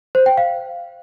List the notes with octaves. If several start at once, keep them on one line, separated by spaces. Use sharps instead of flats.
C5
G5
F5